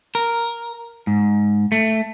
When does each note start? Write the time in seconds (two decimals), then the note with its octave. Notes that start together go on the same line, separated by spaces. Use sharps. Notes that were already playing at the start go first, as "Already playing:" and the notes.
0.15 A#4
1.07 G#2
1.72 A3